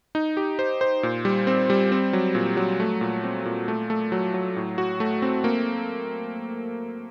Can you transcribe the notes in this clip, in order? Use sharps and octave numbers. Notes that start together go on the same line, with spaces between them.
D#4
G4
C5
C5
A#2
G3
C4
G3
C4
F#3
A#2
F#3
A3
A#2
C4
A#2
A3
A3
F#3
F#3
A2
F#4
A3
C4
A#3